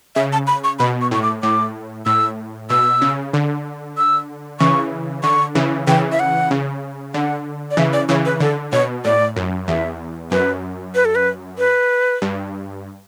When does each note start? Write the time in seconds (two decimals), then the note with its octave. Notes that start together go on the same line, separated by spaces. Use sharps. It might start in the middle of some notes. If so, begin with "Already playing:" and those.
0.15 C#3 E5
0.33 A5
0.47 B5
0.64 C#6
0.79 B2 B5
1.01 C#6
1.11 A2 C#6
1.22 D6
1.43 A2 D6
2.06 A2 E6
2.70 B2 E6
3.02 C#3
3.33 D3
3.97 E6
4.60 C#3 E3 C#6
5.23 D3 C#6
5.55 C#3 E3
5.87 C#3 E3 G5
6.12 E5
6.20 F#5
6.51 C#3
7.14 D3 F#5
7.71 D5
7.77 C#3 E3 E5
7.93 D5
8.09 C#3 E3 C#5
8.25 B4
8.40 D3 A4
8.72 B2 C#5
9.05 A2 D5
9.36 F#2
9.68 E2 E5
10.31 F#2 B4
10.95 B4
11.05 A4
11.15 B4
11.58 B4
12.22 G2